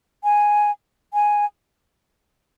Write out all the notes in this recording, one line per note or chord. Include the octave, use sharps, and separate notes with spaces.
G#5
G#5